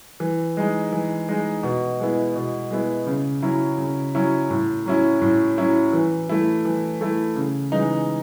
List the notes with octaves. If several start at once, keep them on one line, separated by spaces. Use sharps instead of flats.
E3
G#3 D#4
E3
G#3 D#4
B2
G#3 B3 E4
B2
G#3 B3 E4
C#3
F#3 C#4 E4
C#3
F#3 C#4 E4
A2
F#3 C#4 E4
A2
F#3 C#4 E4
E3
A3 E4
E3
A3 E4
C#3
E3 G#3 D#4